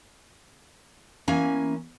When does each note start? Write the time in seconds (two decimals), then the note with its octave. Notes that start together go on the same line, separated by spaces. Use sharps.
1.28 E3 A#3 C#4 G#5